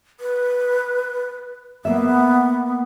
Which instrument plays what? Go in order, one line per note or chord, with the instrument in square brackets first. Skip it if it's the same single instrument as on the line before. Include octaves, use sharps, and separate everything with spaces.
[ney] B4
[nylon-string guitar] A#3 E5 [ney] B3